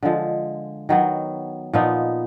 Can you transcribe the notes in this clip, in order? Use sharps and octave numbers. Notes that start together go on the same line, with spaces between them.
D3 F3 G#3
D#3 F#3 B3
A#2 F3 B3 D#4